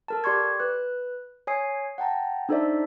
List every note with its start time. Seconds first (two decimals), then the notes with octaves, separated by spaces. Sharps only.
0.08 A4 A#4 A5
0.24 G4 D5 C6 C#6 G#6
0.60 B4 F#6
1.47 C#5 G#5 D#6 C7
1.98 F#5 G5 A5 A#5
2.49 D4 D#4 A4 C5 D5 E5